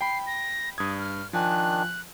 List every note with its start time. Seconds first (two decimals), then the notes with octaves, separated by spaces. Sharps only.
0.01 G5 B5 C7
0.27 A#6
0.78 G2 D#6 G#6
0.99 F6
1.33 D#3 F3 D4 G#5 F#6